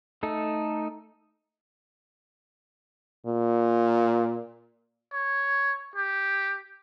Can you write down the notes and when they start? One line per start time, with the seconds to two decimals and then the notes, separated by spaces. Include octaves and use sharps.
0.23 A3 D#4 A4
3.26 A#2
5.13 C#5
5.96 G4